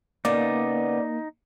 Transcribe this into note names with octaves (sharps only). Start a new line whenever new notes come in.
C#3 A#3 B3 D#4 D5